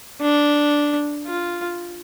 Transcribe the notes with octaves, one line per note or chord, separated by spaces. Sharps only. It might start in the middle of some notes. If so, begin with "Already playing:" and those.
D4
F4